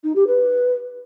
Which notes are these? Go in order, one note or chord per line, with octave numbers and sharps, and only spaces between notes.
D#4
G4
B4